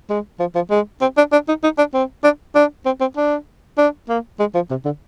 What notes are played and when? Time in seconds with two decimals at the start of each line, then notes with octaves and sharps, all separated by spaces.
0.10 G#3
0.40 F3
0.56 F3
0.70 G#3
1.01 C4
1.17 D4
1.32 D4
1.48 D#4
1.64 D#4
1.78 D4
1.94 C4
2.24 D4
2.55 D4
2.86 C4
3.01 C4
3.17 D4
3.78 D4
4.09 A#3
4.40 G#3
4.55 F3
4.71 C3
4.85 D3